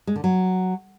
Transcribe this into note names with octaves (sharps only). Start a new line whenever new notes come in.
G#3
D3
F#3